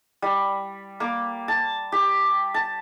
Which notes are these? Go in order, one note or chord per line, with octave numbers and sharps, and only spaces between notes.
G3
A#3
A5
G4
A5